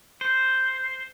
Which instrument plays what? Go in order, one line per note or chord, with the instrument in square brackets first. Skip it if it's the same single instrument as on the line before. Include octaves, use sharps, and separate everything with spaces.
[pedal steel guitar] C5